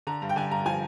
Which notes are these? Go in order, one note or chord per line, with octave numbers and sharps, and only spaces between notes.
D3 A#5
G2
G5
D3 G#5
G2 A#5
F3 G#5